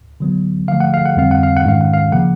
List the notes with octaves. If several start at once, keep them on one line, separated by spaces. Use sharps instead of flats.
D3 F#3 B3
D3 F3 A3 F5
F#5
F5
F#5
F2 D3 G3 C4 F5
F#5
F5
F#5
G#2 D#3 G#3 C#4 F5
F#5
F5
C#3 F3 A#3 F#5